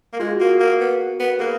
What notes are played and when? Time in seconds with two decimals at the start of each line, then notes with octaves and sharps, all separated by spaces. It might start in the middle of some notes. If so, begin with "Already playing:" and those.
0.13 A#3
0.20 G#3 F4
0.33 F#4
0.40 A#3
0.47 G#4
0.60 A#3 F#4 A#4
0.80 B3
1.20 B3
1.39 A#3 G#4 B4